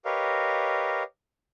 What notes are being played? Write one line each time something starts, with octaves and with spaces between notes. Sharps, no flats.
G4 A#4 B4 C#5 D#5 F5